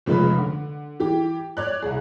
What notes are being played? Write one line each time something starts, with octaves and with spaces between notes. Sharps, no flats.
F1 C#3 F3 G#3 B4
D3
E3 G4
C#5 D5 F#6
C2 G#4